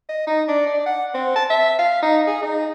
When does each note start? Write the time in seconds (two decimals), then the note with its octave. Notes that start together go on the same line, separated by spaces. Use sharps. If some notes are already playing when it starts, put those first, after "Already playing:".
0.09 D#5
0.27 D#4
0.48 D4
0.67 D5
0.86 F#5
1.14 C4
1.36 A5
1.50 E5
1.79 F5
2.03 D#4
2.27 G#4
2.42 D#4